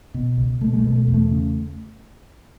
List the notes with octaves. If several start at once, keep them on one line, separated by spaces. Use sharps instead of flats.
B2
C#2
B2 A3
G#3
A3
B2
A3
E2
A3
C#3